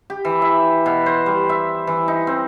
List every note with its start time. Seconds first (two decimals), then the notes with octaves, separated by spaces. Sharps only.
0.10 G4
0.25 E3
0.42 E5
0.86 B2
1.06 C5
1.26 G3
1.49 E5
1.87 E3
2.08 D#4
2.27 C4